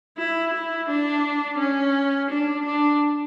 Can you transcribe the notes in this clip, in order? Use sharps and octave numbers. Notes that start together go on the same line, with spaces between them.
E4
E4
D4
C#4
D4
D4